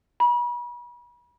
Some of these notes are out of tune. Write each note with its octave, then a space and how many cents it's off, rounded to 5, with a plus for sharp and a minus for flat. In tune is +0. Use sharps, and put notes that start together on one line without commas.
B5 -40